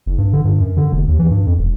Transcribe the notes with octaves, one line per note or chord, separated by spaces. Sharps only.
F#1
G2
D3
G2
F#2
D3
F1
D#2
E3
G2
F2
E1